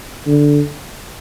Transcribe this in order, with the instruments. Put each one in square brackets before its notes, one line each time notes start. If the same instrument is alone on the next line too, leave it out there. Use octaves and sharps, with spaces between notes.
[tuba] D3